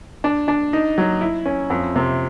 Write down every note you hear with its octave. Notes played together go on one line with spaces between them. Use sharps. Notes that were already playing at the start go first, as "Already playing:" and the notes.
D4
D4
D#4
F#3
E4
C#4
F2
C3